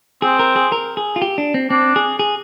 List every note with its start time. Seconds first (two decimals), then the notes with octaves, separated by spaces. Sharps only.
0.22 C4 G#4
0.39 A#4
0.56 G#4
0.72 A#4
0.97 G#4
1.16 F4
1.22 G4
1.38 D4
1.54 C4
1.70 C4 D4
1.96 G#4
2.19 G#4